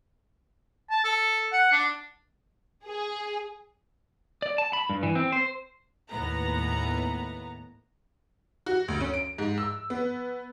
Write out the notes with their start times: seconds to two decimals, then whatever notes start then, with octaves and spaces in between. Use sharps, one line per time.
0.90 A5
1.04 A4
1.52 F#5
1.72 D4
2.86 G#4
4.42 D5
4.58 A5
4.73 B5
4.90 G2
5.03 E3
5.15 C4
5.32 C5
6.09 D#2 A2 B3 A#5
8.66 F#4
8.88 D2
9.00 C#4
9.14 D7
9.38 G#2
9.58 E6
9.90 B3